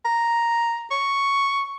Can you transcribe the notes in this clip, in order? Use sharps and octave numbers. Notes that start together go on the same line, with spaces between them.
A#5
C#6